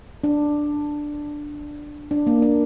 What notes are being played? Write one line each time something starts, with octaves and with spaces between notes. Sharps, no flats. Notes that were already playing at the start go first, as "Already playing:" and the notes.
D4
D4
A#3
D4